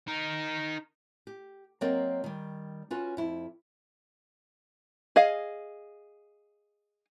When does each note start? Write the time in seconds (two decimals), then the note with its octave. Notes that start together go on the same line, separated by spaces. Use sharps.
0.08 D#4 A#4
1.27 G4
1.81 F#3 A#3 C4 A#4 D5 D#5
2.24 D#3 G3
2.91 C#4 F4 F#4 B4
3.17 F2 E4
5.16 G#4 D#5 F5